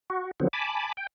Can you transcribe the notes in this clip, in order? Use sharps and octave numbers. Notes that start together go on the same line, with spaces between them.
F#4
D3 F3 F#3 B3 C4
G#5 A5 B5 D6
G5